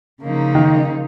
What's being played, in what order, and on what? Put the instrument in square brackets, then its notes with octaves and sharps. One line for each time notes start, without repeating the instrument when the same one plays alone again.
[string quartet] C#3 F3 A#3 D#4
[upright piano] D#3